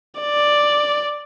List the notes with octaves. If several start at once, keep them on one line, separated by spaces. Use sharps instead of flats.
D5